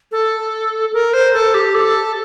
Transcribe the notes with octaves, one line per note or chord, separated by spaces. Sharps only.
A4
A#4
C5
A4
G4
A4